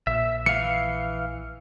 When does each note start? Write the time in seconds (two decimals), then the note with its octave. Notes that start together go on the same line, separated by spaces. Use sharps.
0.07 A#1 E5
0.46 E3 F5 C#7